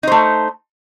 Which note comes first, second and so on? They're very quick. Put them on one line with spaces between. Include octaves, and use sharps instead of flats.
D#4 C5 A3